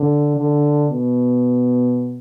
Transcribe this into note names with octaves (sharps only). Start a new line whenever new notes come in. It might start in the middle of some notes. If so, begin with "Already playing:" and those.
Already playing: D3
D3
B2